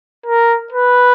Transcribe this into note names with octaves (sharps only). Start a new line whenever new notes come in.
A#4
B4